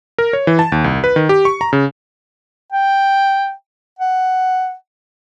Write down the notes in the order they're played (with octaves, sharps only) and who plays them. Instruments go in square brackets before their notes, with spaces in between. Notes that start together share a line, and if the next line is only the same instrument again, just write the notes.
[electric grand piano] A#4
C#5
E3
A5
D#2
C2
B4
D#3
G4
C#6
A#5
C#3
[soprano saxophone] G5
F#5